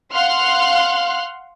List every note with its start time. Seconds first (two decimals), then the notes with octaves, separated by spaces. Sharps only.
0.14 F5 F#5 C6 F6 F#6